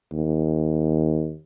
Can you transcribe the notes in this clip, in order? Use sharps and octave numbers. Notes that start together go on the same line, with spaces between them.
D#2